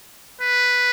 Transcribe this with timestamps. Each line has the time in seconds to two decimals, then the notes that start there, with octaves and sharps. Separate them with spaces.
0.41 B4